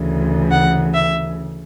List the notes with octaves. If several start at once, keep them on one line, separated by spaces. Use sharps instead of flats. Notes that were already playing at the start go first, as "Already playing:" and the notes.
Already playing: D2 C#3 E3
F#5
E5